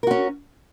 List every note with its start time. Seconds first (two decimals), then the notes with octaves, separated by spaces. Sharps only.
0.03 A#4
0.07 F#4
0.11 C#4